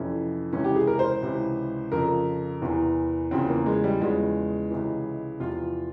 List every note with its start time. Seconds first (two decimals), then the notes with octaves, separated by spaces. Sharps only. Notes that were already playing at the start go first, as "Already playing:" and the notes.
Already playing: F2 C3 E3 C#4
0.53 C#2 C3 E3 C#4
0.64 G4
0.76 G#4
0.87 A#4
0.99 C5
1.23 C#2 C3 E3
1.92 F2 C#3 F3 A#4
2.61 E2 C3 E3
3.31 E2 C#3 F3 C4
3.49 A#3
3.66 G#3
3.84 G3
4.01 E2 C#3 F3 G#3
4.70 C#2 C3 E3
5.40 E2 C3 F3 F4